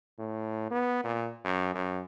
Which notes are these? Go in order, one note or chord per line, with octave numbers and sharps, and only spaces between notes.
A2
B3
A#2
F#2
F#2